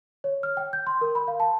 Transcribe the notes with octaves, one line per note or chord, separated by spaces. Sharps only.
C#5
F6
G5
G6
C6
A#4
B5
F5
A5